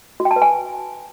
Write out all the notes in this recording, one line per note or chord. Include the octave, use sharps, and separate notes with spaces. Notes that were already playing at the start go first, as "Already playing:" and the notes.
F#4
G5
A5
B4
G#5